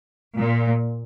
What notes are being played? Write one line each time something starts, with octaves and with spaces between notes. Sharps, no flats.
A#2